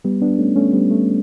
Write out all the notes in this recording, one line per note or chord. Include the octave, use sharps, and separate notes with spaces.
G3 B3
B3 D4
A3 C#4
A3 C#4
G3 B3
A3